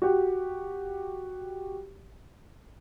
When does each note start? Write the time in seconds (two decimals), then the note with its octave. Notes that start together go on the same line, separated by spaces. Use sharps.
0.02 F#4 G4